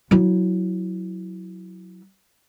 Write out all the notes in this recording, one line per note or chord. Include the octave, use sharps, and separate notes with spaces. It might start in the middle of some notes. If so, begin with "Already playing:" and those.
F#3 E4